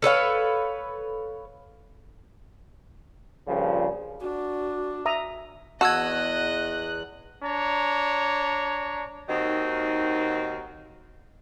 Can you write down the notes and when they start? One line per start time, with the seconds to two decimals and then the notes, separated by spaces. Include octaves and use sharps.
0.02 A4 B4 C#5 F5
3.48 G2 A#2 C#3 F3
4.21 D4 F#4
5.06 E5 A#5 D#6
5.81 E2 F#4 D#5 A5 E6 F#6 G#6
7.43 D4 C#5 A#5
9.28 D#2 D#3 C4 D#4 F#4